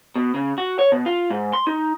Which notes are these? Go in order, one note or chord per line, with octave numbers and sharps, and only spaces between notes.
B2
C#3
F#4
C#5
B2
F4
G#2
C6
D#4